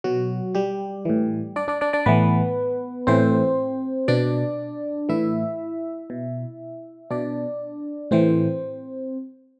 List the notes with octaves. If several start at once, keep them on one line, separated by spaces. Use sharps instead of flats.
B2 F#3 F#4
G3 G4
A2 E3
D4 D5
D4 D5
D4 D5
D4 D5
A2 E3 B3 B4
A2 E3 C4 C5
B2 D4 D5
A2 E3 E4 E5
B2
B2 D4 D5
A2 E3 C4 C5